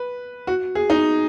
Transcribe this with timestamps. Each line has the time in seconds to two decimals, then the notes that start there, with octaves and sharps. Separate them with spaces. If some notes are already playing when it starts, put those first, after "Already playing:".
Already playing: B4
0.47 F#4
0.75 G#4
0.90 D#4